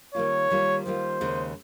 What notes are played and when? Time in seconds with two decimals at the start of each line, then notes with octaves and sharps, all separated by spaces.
0.14 D#3 G3 A#3 F4 C#5
0.50 D#3 G3 A#3 F4
0.86 D#3 G3 A#3 F4 C5
1.21 D#2 C#3 G#3